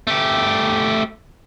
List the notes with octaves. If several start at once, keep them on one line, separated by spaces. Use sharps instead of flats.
A3 G4